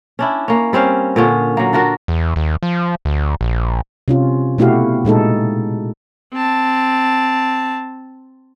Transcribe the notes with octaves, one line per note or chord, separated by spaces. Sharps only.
C#4 D4 E4
A#3 C#4
G3 C4 C#4 F5
A#2 D3 C#4 F4
F#3 A#3
D4 F4 F#4 A#4
E2
D#2
F3
D2
A#1
C3 C#4 F4
B2 A3 E4 F#4 G4 F5
A#2 G#3 D#4 A4
C4 A5